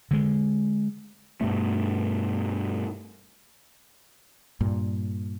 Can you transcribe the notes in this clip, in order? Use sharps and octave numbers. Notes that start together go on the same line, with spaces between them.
D3 G#3
G2 B2 A3
G2 A#2